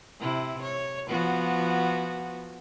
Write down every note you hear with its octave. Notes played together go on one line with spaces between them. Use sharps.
C3 E4
C#5
F3 B3 F#4